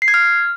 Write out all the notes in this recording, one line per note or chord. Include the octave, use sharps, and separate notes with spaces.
C7
G#6
F6